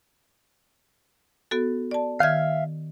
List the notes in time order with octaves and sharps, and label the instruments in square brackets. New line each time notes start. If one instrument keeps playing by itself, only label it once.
[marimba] B3 F#4 A4
D5 A5
[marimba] D#3 F6 G#6 [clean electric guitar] E5 F5